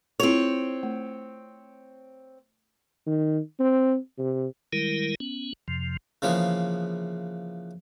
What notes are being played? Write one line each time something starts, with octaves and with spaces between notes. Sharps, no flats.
C4 E4 F4 G#4 C#5
A3
D#3
C4
C3
D#3 G3 G#3 E4 A#4
B3 C#4
F2 C3 F3
C#3 E3 F3 A#3 B3 G#4